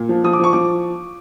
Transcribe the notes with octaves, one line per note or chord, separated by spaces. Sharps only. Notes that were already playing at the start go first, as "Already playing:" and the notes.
Already playing: A#2
F3
F3 D#6
D6
F3 C#6
F3 D6